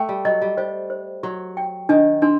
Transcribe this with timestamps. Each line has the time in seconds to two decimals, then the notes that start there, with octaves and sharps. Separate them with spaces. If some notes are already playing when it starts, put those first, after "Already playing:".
Already playing: A3 G5
0.09 G3
0.25 F#3 D#5
0.42 G3
0.57 G3 C5
0.90 C5
1.23 F#3 G4
1.57 G5
1.89 D#3 D4
2.22 C4 D4